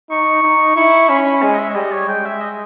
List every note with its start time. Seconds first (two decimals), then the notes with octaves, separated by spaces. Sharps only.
0.10 D#4 C#6
0.43 D#4
0.76 E4 C#6
1.09 C#4 B5
1.18 C#6
1.26 B5
1.42 G#3 G#5
1.55 D#5
1.59 E5
1.70 C#5
1.75 G3 D#5
1.91 C#5
2.08 G#3 G5
2.26 E5
2.41 D#5